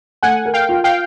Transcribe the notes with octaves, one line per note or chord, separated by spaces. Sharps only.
A3 F#5 G#5
A#4
F5 G5
F4
F5 G5